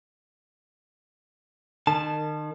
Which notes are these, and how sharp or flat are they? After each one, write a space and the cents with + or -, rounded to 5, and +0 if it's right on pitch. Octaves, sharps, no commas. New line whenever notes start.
D#3 -35 A5 +0